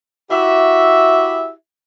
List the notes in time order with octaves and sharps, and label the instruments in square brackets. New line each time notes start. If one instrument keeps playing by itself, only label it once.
[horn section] E4 F#4 G4 E5